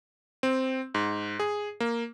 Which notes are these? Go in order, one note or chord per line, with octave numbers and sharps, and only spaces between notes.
C4
G#2
G#4
A#3